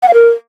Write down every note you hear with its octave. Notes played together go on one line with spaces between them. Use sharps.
F#5
F5
A#4